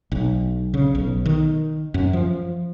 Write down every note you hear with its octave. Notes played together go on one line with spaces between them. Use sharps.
B1
C#3
B1
D#3
F#2
F3